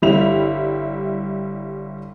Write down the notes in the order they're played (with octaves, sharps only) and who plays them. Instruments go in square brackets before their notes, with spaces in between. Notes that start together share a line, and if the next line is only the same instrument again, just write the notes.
[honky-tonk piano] G1 G3 E4 F7